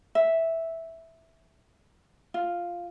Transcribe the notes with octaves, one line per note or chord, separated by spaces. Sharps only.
E5
F4